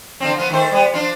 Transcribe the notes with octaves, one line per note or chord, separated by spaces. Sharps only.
D3 F3 C4
F3 B3
D#3 A3 C5
G3 B3
F3 D4